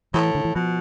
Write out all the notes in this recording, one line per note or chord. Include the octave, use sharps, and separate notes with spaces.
A2 E3
D3
E3
B2 F3